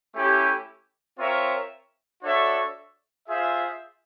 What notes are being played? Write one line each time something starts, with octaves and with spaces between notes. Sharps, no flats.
A3 C#4 E4 G4
C4 F4 A#4 C#5 E5
D4 F#4 A4 C#5 E5
F4 G#4 C5 E5